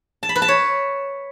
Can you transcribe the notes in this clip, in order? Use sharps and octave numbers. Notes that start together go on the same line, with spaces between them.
A5
B5
B4
A5
C#5